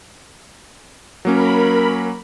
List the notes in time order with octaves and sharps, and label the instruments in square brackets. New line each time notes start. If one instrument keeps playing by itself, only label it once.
[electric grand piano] F#3 A#3 C#4 [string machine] A#4 B5